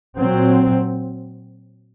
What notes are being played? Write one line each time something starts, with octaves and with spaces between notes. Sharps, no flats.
A#2 F#3 C4